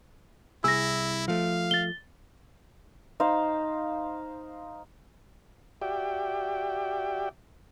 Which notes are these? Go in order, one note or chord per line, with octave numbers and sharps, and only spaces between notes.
C2 E4 G#4 E6 A#6
F3 A3 F5
A6 G7
D#4 C5 F5
F#4 G4 D5 E5 G5